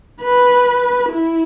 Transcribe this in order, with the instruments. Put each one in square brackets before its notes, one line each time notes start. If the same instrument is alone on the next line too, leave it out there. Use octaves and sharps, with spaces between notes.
[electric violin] B4
E4